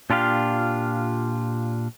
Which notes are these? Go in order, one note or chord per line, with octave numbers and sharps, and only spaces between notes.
A#2 D4 F4 G4 F5